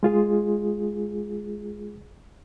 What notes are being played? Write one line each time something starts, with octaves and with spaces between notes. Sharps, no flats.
G#3 F4 G#4